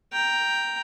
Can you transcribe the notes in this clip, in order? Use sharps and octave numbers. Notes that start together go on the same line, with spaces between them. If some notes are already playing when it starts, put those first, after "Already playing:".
G5 A#5